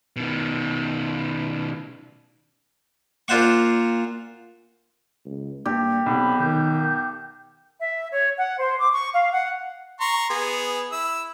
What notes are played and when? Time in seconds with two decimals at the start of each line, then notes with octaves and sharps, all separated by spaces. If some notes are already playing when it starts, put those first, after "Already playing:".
0.16 B2 D#3
3.28 A#2 D4 F4 C5 F#5 C#6
5.25 C#2
5.66 G2 A#3 G4
6.06 B1 C3 B5
6.39 D#3 G6
7.80 E5
8.13 C#5
8.37 F#5
8.59 C5
8.78 D6
8.92 C#6
9.13 F5
9.32 F#5
10.01 A#5 C6 C#6
10.30 B3 G#4
10.92 E4 E6